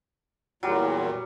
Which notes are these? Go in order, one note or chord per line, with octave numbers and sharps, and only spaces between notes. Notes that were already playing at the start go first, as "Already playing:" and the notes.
E2 A#2 F#3 G3